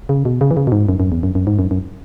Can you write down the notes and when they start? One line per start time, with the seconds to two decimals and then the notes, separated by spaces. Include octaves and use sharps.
0.09 C#3
0.25 B2
0.41 C#3
0.51 E3
0.57 C#3
0.67 B2
0.72 G#2
0.89 F#2
1.00 F#2
1.12 E2
1.23 F#2
1.35 F#2
1.47 G#2
1.59 F#2
1.71 F#2